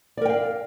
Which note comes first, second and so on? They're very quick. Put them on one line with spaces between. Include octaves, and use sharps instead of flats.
D5 A#4 G5 F5